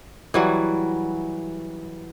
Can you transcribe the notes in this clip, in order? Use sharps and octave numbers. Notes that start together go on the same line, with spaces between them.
E3 F#3 G3